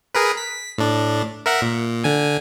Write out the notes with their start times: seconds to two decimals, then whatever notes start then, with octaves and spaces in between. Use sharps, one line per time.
0.14 G#4 A#4 B4
0.37 B6
0.78 A2 D4
1.46 A#4 E5 F#5
1.62 A#2
2.04 D3 G#5